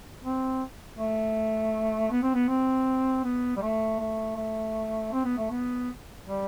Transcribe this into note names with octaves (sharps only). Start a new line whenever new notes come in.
C4
A3
B3
C4
B3
C4
B3
G3
A3
A3
A3
C4
B3
A3
B3
G3